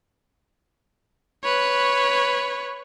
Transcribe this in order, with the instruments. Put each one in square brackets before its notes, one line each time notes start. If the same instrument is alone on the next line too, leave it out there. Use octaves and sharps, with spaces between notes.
[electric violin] B4 C#5